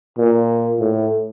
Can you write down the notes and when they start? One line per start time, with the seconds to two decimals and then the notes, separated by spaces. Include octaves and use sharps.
0.18 A#2
0.80 A2